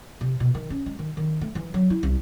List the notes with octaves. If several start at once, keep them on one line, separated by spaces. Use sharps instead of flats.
C3
B2
D#3
C#4
G#3
D#3
D#3
A3
E3
F#3
E4
C2